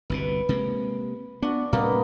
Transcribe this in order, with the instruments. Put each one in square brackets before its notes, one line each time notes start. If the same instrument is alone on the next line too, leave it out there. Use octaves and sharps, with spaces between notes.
[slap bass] G1 C2 B2 [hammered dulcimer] B4
[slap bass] C3 G#3 A#3
[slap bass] B3 [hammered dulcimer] D4 F#4
[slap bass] A2 C3 G3 [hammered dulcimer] A#3 B3 D#5